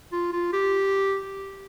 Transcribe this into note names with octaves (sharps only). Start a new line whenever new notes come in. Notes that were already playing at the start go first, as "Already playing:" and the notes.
F4
F4
G4